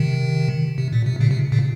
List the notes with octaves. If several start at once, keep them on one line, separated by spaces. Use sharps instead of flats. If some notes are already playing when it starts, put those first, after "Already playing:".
Already playing: C3 D#3
C3
A#2
C3
A#2 C#3
C3
A#2 C#3